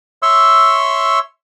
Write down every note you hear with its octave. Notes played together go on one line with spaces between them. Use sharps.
C#5 E5 C6 C#6 E6